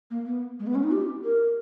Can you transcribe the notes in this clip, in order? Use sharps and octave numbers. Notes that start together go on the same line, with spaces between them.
A#3
B3
G#3
B3
C#4
D#4
G4
A#4